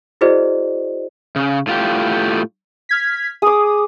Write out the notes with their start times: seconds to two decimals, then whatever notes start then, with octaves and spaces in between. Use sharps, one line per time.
0.21 E4 F#4 G#4 C5 D5 D#5
1.36 C#3
1.67 A2 F4 G4
2.89 F6 G#6 B6
3.42 G#4 D6 D#6